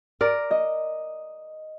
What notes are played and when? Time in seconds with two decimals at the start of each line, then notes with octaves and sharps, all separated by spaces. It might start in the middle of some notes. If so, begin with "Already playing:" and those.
0.21 A#4 D5
0.51 D#5